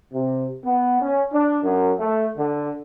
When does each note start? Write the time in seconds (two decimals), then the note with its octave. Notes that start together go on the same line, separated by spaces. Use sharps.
0.13 C3
0.64 B3
1.02 C#4
1.33 D4
1.63 F#2
1.99 A3
2.38 D3